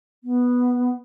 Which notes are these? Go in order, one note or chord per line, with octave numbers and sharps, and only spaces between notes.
B3